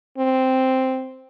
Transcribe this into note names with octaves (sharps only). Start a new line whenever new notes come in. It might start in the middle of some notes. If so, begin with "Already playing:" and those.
C4